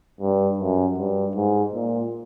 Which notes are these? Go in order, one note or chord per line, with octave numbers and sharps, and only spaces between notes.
G2
F#2
G2
G#2
A#2